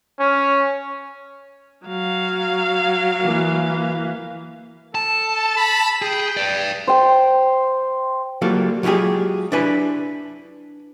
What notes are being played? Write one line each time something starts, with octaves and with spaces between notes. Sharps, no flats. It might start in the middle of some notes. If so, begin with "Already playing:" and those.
C#4
F#3 F5
E3 A#3
A4 A5
B5
G#4 G5
B4 D5
C5 G5
F#3 G3 A#3 F4 A4
F#3 G#3 F4 G4 G#4
D4 E4 B4 G#5